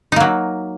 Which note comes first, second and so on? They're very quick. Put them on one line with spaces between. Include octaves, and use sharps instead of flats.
D#4 A#3 F#3